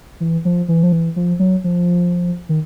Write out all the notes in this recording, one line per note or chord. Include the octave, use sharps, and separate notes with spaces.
E3
F3
E3
F3
E3
F3
F#3
F3
D#3